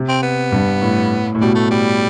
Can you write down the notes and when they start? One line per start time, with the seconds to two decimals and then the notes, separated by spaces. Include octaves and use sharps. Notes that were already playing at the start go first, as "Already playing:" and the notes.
Already playing: C3
0.09 C4
0.23 B3
0.52 G2
0.81 A2
1.35 A2
1.41 B2 G3
1.55 A3
1.70 G3